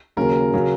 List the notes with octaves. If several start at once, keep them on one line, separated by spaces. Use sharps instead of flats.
D#2 C#3 F#3 A#4
C#3 F#3